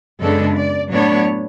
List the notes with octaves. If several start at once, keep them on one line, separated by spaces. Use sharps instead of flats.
F#2 C#3 G#3 B3 D4 A4
D5
A2 F#3 B3 D4 C#5